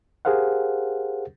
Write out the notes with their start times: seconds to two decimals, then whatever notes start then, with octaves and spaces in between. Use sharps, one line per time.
0.25 G4 G#4 A#4 C5 F5 F#5